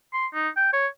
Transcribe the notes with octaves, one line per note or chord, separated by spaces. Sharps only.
C6
D#4
G5
C#5